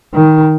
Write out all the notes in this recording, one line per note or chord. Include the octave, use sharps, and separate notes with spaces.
D#3